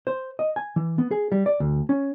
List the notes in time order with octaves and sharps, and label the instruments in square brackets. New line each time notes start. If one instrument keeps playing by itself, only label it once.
[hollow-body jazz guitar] C5
D#5
G#5
E3
B3
G#4
G3
D5
D2
C#4